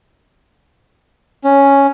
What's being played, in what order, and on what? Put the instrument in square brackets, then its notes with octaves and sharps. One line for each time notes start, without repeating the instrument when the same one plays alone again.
[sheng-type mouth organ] C#4